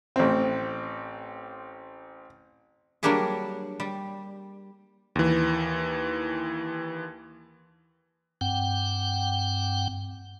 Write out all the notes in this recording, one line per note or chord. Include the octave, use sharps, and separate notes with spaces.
A1 C4
F#3 G3 A#3 D4 G4 G#4
G3
D#2 E3
G2 C4 F#5 G5